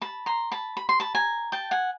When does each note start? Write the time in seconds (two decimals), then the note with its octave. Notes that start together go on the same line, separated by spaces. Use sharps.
0.01 A5 B5
0.26 A#5 C6
0.52 A5 B5
0.77 B5
0.89 C6
1.00 A5 B5
1.15 G#5 A#5
1.52 G5 A5
1.71 F#5 G#5